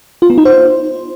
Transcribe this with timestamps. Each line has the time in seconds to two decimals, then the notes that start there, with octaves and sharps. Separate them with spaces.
0.22 F4
0.30 B3
0.38 D#4
0.45 C5